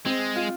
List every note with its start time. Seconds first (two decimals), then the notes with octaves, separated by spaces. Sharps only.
0.05 G#3 C4
0.36 F4